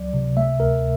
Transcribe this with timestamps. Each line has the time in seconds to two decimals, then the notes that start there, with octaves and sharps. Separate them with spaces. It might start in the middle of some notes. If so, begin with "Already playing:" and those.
Already playing: C#2 F#3 D5
0.14 C3
0.37 A3 E5
0.60 D2 A#4